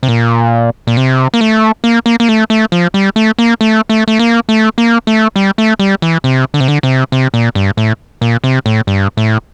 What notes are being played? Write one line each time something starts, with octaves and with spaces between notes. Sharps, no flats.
C3
A#2
A#2
C3
A#3
A3
A#3
A#3
A#3
A3
A3
F3
G3
A3
A#3
A3
A3
A3
A#3
A3
A#3
A3
G3
A3
G3
E3
C3
D3
C3
D3
C3
C3
A#2
G2
A2
A#2
C3
A2
G2
A2